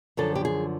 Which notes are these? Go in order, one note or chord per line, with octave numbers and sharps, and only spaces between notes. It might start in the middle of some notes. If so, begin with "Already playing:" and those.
F#2 D3 F3 A4
G4
G#4